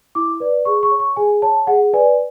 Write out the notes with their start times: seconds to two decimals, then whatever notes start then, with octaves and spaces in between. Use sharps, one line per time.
0.15 E4 D6
0.40 B4 D5
0.65 G#4 C#6
0.83 C#6
0.91 C#5
1.00 C#6
1.16 G#4 G#5
1.42 C#5 A5
1.67 G#4 F#5
1.93 B4 D5 G#5